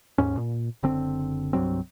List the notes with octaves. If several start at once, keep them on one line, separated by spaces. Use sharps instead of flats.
D#2 G#2 C#4
A#2
F#1 D3 C4
C2 G2 F#3 C4